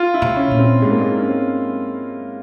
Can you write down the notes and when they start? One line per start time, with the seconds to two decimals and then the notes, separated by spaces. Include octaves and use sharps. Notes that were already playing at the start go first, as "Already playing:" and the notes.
Already playing: F4
0.14 E4
0.22 C3
0.36 C#4
0.51 A#2
0.59 C4
0.82 G#2 G#3
0.91 A#3
1.01 G#3
1.18 C#4
1.28 C4